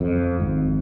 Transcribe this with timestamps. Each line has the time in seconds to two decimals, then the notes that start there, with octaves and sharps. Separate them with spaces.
0.01 F2
0.40 G#1